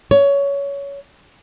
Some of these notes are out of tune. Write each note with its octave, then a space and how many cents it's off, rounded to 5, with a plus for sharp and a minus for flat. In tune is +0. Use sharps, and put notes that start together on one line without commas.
C#5 +20